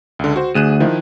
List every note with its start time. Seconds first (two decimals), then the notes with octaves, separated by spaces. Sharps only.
0.19 C#2 D3
0.36 F#4 C5
0.55 D2 G#4 F#6 D#7
0.80 D#3 F3 E4